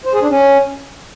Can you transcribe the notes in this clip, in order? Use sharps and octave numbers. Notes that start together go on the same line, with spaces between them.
C5
G#4
D4
C#4